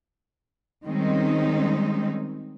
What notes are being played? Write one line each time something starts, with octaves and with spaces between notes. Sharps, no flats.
D#3 G3 G#3 C4 C#4 D#4